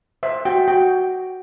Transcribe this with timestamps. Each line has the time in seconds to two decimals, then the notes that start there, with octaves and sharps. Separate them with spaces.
0.23 C5 E5
0.45 F#4 G5
0.68 F#4 G5